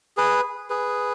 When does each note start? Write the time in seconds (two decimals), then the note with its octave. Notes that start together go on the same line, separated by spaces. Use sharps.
0.17 G#4 B4
0.70 G#4 B4